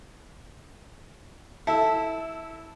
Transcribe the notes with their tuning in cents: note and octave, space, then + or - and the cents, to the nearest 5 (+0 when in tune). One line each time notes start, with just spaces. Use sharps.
E4 -15 A4 +0